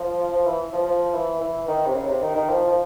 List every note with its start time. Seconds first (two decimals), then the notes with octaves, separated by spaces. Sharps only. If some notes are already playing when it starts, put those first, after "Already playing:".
Already playing: F3
0.31 F3
0.46 E3
0.73 F3
0.86 F3
1.14 E3
1.41 E3
1.68 D#3
1.86 C3
1.94 C#3
2.09 C3
2.21 D#3
2.35 D#3
2.49 F3
2.67 F3